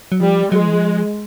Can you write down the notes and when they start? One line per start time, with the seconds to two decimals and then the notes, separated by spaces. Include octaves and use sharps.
0.12 F#3
0.20 F3 G3
0.52 F#3 G#3
0.60 F3
0.67 E3
0.73 F3